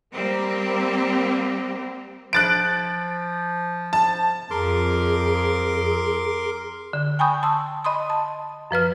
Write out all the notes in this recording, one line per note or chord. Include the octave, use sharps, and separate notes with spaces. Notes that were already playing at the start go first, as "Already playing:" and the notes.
G3 A#3 C4
F3 F#6 A6 D7
A5
F2 G#4 A#4 C6 D6
D3
G5 G#5 B5 C#6 D#6 G6
A5 C6 E6
D#5 B5 C6 D#6
A5
F#2 F3 B4 F6